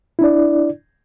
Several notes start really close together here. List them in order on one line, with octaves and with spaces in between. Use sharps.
E4 D4 D5